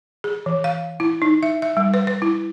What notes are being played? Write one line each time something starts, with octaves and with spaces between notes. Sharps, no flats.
G#4
E3
F5
E4
D#4
E5
E5
G3
B4
B4
E4